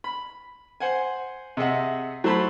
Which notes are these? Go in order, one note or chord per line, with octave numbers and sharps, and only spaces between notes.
B5
C5 F#5 G#5
C3 G#4 D#5 E5 F#5
F#3 A3 C5 A5 B5